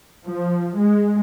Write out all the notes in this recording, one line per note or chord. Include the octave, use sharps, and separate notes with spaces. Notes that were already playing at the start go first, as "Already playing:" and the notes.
F3
G#3